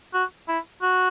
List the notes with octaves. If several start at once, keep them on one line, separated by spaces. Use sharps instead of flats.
F#4
E4
F#4